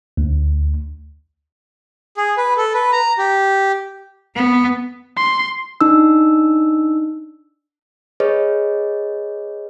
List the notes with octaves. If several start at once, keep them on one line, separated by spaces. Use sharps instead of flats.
D2
G#4
B4
A4
B4
A#5
G4
B3
C6
D4 D#4 E6
G#4 B4 C#5 D#5